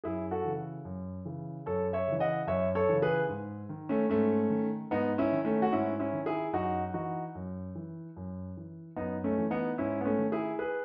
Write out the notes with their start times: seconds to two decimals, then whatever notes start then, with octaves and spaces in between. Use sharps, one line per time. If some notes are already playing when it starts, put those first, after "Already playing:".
0.04 F#2 E4 G#4
0.31 F#4 A4
0.45 C#3 E3
0.85 F#2
1.25 C#3 E3
1.66 F#2 A4 C#5
1.93 C#5 E5
2.07 C#3 E3
2.20 D#5 F#5
2.47 F#2 C#5 E5
2.75 A4 C#5
2.89 C#3 E3
3.02 G#4 B4
3.29 G#2
3.69 D#3
3.89 A3 C#4
4.09 G#2 A3 C#4
4.50 D#3
4.91 G#2 B3 D#4
5.18 C#4 E4
5.32 D#3
5.45 A3 C#4
5.62 F#4
5.72 G#2 C#4 E4
6.00 C#4 E4
6.13 D#3
6.26 E4 G#4
6.53 F#2 D#4 F#4
6.94 E3 D#4 F#4
7.35 F#2
7.75 E3
8.16 F#2
8.57 E3
8.96 F#2 B3 D#4
9.24 A3 C#4
9.38 E3
9.51 B3 D#4
9.78 G#2 C#4 E4
10.01 B3
10.05 A3 C#4
10.18 D#3
10.32 E4 G#4
10.59 G#4 B4